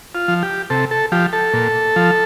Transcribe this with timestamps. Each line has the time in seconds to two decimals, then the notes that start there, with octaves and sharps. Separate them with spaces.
0.15 F4
0.28 F3
0.43 G4
0.70 C3 A4
0.91 A4
1.12 F3 G4
1.33 A4
1.53 A#2
1.96 F3